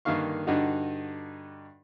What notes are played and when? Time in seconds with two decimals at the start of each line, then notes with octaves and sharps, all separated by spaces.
0.05 G2 D3 D#3 A#3 F5 C#6
0.47 G2 D3 D#4 F#4